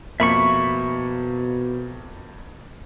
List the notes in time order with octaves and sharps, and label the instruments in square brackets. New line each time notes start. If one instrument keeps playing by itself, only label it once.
[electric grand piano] F2 A#3 [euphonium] B2 [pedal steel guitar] E5 B5 C#6